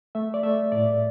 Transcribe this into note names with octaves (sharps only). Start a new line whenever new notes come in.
A3 E5
D5
A3 E5
A2 D5